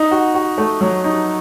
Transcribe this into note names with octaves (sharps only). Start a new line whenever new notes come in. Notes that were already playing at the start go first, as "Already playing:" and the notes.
Already playing: D#4
F#4
F#4
A3
F#3
D#4